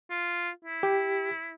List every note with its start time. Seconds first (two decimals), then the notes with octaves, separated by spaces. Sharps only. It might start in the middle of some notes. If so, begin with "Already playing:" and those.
0.10 F4
0.65 E4
0.83 G4